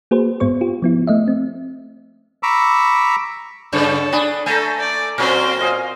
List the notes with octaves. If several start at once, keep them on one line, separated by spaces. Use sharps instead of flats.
A#3 F#4 G#4 B4 C5
G#2 B3 C5 C#6
F4 G4
F3 B3 E4
A3 D#5 E5
C4
A#5 B5 C#6 D6 E6
F#2 C#3 A4 C#5
D4 G#5 B5 D#6
A3 A4 G#5 A#5
D5
A#2 F#3 C4 C#4 A#4 C5
D#5 F5 G#5